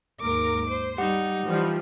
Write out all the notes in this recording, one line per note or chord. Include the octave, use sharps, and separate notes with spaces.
D#2 G#2 A#4 D6
C5
G3 D#4 G4 F#5
E3 F3 G3